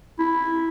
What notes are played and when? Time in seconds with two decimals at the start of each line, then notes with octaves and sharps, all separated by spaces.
0.19 E4